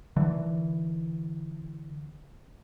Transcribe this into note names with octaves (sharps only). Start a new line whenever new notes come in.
D3 E3